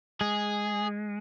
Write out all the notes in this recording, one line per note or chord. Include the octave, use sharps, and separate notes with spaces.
G#3 G#4